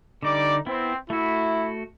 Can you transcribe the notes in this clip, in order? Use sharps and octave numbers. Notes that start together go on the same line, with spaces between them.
D3 G3 D#4 D5 D6
B3 C4 E4
A3 E4 F#4